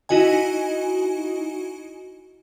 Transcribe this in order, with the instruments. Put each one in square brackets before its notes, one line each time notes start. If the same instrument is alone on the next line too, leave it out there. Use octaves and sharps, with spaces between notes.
[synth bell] D#4 E4 F#4 D#5 G#5